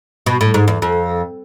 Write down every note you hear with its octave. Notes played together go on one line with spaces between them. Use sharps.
B2
A2
G#2
E2
F2